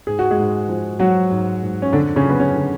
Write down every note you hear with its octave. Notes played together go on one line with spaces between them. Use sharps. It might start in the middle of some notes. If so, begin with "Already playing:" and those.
G#2 G#4
F#4
G#3 G#4
G#2
F3
F3 F#3 F#4
G#2
G#2
C#4
F2 D3 D4
C#3 C#4
F#3
B3
C#3 C#4
D3